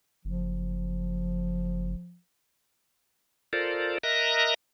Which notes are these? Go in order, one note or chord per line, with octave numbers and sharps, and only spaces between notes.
F#1 F3
F4 A4 A#4 C5 D5
A#4 D#5 E5 A#5 F#6 A#6